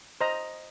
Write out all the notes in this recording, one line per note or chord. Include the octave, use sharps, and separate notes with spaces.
C5 D#5 A#5